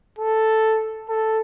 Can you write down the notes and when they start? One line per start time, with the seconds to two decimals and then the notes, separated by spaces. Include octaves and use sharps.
0.19 A4
1.09 A4